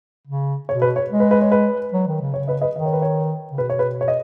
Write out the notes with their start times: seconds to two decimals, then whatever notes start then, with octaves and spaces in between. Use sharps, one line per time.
0.27 C#3
0.69 B2 C#5
0.82 B4
0.96 C#5
1.10 G#3
1.20 B4
1.31 B4
1.42 C#5
1.52 B4
1.93 F#3
2.07 D#3
2.21 C#3
2.34 C#3 C#5
2.48 B4 D#5
2.61 B4 D#5
2.75 D#3 D#5
2.85 C#5
2.93 B4
3.02 C#5
3.52 C#3
3.58 B2 B4
3.70 C#5
3.79 B4
4.01 C#5
4.08 D#5